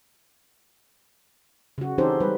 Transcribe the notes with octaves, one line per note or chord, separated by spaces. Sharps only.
C#3 F#4
E3 C#4 D#4 G4 A4 C5
G3 G#3 B4